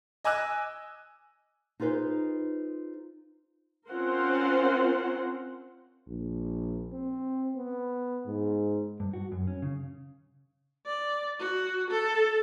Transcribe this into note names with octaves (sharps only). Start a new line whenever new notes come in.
D#5 G#5 D6 E6 F#6
D#4 F4 G#4 B4 C5
C4 C#4 F4 A#4 C5 F#5
A#1
C4
B3
G#2
G2
F#4
F#2
C#4
C#3
D5
F#4
A4